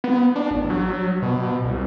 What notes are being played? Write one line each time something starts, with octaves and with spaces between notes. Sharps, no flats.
B3
D4
A1
F#3
B2
C2